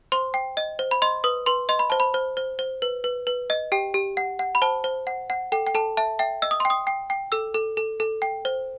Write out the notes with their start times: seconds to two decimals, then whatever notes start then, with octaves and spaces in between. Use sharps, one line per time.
0.12 C5 C6
0.34 G5
0.57 D#5
0.79 C5
0.91 B5
1.02 D#5 C6
1.24 B4 D#6
1.46 B4 C6
1.69 D#5 C6
1.79 B5
1.90 C5 A5
2.00 B5
2.14 C5
2.37 C5
2.59 C5
2.82 B4
3.04 B4
3.27 B4
3.50 D#5
3.72 G4 G5
3.94 G4
4.17 F#5
4.39 F#5
4.55 B5
4.62 C5 A5
4.84 C5
5.07 F#5
5.30 F#5
5.52 A4 G5
5.67 G5
5.75 A4 A5
5.97 E5 A5
6.19 E5 G5
6.42 D#5 E6
6.51 D#6
6.60 C6
6.65 G5
6.70 D#6
6.87 G5
7.10 G5
7.32 A4 E6
7.54 A4
7.77 A4
8.00 A4
8.22 G5
8.45 C5